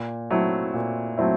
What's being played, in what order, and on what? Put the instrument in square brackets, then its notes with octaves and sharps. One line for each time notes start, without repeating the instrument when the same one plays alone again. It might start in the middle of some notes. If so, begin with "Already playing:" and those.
Already playing: [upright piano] A#2
F#3 A3 C4 E4
A#2
F#3 A3 C4 E4